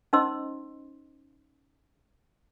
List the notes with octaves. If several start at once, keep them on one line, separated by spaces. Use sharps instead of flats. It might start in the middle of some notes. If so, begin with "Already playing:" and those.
C#4 D#4 C5 D#5 C6 E6